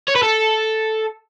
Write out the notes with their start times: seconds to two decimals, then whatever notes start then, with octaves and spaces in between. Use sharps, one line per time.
0.08 C#5
0.16 B4
0.23 A4